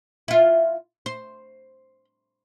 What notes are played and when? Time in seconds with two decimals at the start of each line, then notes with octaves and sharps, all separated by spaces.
0.28 E4 F4
1.06 C5